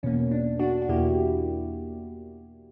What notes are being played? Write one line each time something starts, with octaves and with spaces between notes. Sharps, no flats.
E2 B2 A#3 C#4
D4
D4 F#4
F#4
E2 B2 A#3 E4 G4